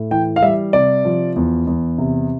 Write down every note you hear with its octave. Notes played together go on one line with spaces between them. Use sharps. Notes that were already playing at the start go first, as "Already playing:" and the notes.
Already playing: A2
E3 G5
F5
G3 E5
C3 D5
F3
E2
E2
C3